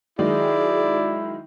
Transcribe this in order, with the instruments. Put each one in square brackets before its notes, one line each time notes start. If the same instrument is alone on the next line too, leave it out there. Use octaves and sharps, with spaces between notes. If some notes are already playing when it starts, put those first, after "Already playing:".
[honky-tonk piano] D#3 F#3 G#3 [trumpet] E4 [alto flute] G#4 [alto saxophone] D5